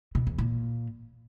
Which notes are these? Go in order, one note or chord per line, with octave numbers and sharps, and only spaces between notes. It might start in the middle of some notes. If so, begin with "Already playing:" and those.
B2
E2
A#2